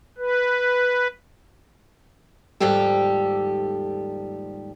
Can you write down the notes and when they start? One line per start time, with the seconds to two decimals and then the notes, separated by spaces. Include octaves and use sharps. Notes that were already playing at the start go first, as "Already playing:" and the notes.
0.17 B4
2.60 D#2 G#2 F3 G3 G4 A4